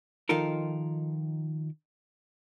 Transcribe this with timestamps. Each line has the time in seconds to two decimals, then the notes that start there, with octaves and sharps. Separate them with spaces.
0.29 D#3 F3 D#4 F4 A4 A#4